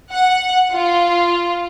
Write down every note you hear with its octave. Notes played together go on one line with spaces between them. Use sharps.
F#5
F4